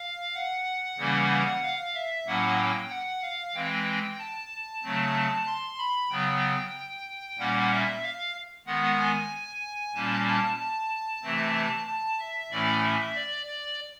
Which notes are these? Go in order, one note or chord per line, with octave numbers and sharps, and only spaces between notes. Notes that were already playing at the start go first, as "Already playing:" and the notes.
Already playing: F5
F#5
C#3 E3 G3 A#3 C#4
F5
E5
A2 F#3 A#3 C#4 F#5
G5
F#5
F5
E3 G#3 C4 G5
A5
C#3 F#3 A3 C4
C6
B5
C#3 F#3 B3 G5
A#2 G3 A#3 C#4 F#5
E5
F5
D#3 G#3 B3 F#5
G#5
A#2 G3 A#3 C#4 A5
A5
A5
C3 E3 A3 C4
A5
E5
A2 E3 A3 C#4 D5
E5
D5
D5